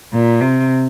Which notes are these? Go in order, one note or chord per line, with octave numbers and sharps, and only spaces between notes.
A#2
C3